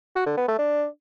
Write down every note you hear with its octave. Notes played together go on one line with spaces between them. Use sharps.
F#4
D3
B3
A3
D4